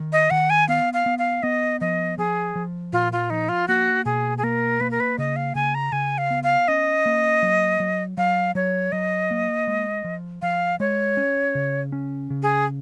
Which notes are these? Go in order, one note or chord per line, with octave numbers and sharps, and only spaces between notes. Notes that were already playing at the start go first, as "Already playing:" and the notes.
Already playing: D#3
D#5
D#3 F#5
G#5
B3 F5
F5
B3
F5
B3 D#5
F3 D#5
F3 G#4
F3
A#2 F4
F4
F3 D#4
F4
A#3 F#4
B2 G#4
G#4
A#3 A#4
A#3 B4
A#4
B4
C#3 D#5
F5
C#3 G#5
A#5
C#3 G#5
F5
B3
F5
C#4 D#5
A#3
F#3
F#3
F#3 F5
F#3 C#5
F#3 D#5
A#3
G#3
F3
F3 F5
G#3 C#5
C#4
C#3
C#4
C#3
G#4